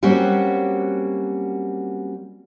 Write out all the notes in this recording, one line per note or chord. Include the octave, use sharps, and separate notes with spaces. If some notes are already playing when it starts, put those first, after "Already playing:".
F#3 G3 A#3 C4 C#4 F#4